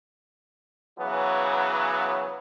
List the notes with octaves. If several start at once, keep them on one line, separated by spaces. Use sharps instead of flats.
C#3 E3 F#3 B3